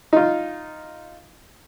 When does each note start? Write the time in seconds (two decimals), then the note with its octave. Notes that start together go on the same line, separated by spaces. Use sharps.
0.13 D#4 F4